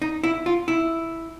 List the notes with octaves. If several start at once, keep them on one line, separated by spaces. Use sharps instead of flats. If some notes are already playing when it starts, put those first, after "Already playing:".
D#4
E4
F4
E4